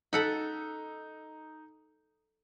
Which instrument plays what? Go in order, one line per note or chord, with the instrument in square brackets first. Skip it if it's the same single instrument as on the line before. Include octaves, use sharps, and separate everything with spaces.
[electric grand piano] D#4 E6 [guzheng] A4 F#5 B5